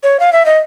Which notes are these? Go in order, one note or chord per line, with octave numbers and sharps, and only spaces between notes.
C#5
F5
E5
D#5